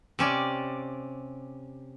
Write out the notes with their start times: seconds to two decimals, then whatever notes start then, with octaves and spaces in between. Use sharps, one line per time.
0.19 C3 C#4 D5